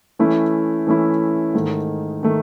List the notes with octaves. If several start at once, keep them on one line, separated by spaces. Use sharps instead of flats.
E3 A3 C#4 E4
E3 A3 C#4 E4
G#2 D#3 A3
D#3 A3